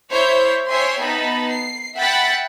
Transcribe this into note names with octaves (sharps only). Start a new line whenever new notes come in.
E4 C5 C#5 E5 G6
C5 C#5 E5 G5 G#5 C6
B3 D#4 A5 B5
C7
E5 F#5 G5 B5 A6 B6